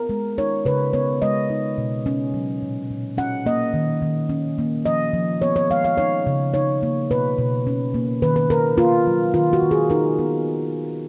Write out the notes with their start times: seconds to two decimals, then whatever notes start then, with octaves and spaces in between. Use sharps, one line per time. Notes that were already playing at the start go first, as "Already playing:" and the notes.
Already playing: B3 A#4
0.09 G#3
0.38 D#4 C#5
0.65 C#3 B4
0.93 B3 C#5
1.22 G#3 D#5
1.50 D#4
1.78 B2
2.06 C#4
2.34 F#3
2.62 A#2
2.91 A#2
3.17 C#4 F#5
3.46 A#3 D#5
3.74 D#3
4.02 D#3
4.29 C#4
4.58 A#3
4.86 F3 D#5
5.13 F3
5.42 B3 C#5
5.56 C#5
5.70 G#3 F5
5.84 F5
5.98 D#4 C#5
6.27 C#3
6.54 D#4 C#5
6.83 A#3
7.11 B2 B4
7.38 B2
7.67 C#4
7.94 A#3
8.22 D#3 B4
8.36 B4
8.50 D#3 A#4
8.78 A#3 F4
9.07 F#3
9.34 D#3 F4
9.53 F#4
9.63 D#3
9.71 G#4
9.90 D#4 A#4
10.19 B3